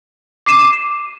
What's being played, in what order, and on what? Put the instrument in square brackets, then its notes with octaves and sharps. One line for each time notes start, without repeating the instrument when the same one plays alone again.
[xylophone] D6 C7 D#7 E7